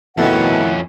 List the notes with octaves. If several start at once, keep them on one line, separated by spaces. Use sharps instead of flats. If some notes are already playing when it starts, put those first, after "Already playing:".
F2 B2 D#3 A3 C#4 E4 F#5